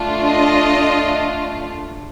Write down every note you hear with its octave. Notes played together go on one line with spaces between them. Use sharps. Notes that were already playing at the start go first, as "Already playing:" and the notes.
Already playing: A3 D4 F4
D#5